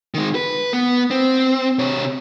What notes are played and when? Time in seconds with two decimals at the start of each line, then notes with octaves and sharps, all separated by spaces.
0.14 D#3 G#3
0.35 B4
0.73 B3
1.11 C4
1.79 C3 C#5